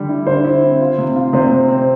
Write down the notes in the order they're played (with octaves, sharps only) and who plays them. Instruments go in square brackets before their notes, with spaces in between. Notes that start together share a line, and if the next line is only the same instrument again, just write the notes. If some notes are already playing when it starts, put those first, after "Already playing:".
Already playing: [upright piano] D3 G3
E4
[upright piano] D3 [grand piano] C5
[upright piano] E4
C4
F4
C3
F4
[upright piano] C3 [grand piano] C5
[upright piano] C3
C4